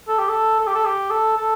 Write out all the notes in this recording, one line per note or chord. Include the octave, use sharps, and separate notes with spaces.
A4
G4
A4
A4
G4
A4
G4
A4
A4